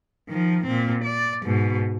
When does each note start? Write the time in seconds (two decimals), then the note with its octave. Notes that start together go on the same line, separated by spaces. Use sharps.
0.29 D#3 F3
0.66 A#2 C4
1.04 D5
1.43 G#2 B2